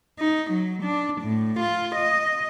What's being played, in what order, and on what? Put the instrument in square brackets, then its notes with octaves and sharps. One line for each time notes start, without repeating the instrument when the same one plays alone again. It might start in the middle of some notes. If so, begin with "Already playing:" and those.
[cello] D#4
F#3
D4
A2
F4
D#5